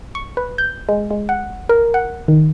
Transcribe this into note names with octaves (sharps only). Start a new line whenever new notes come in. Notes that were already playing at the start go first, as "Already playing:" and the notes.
C#6
B4
G6
G#3
G#3
F#5
A#4
F#5
D#3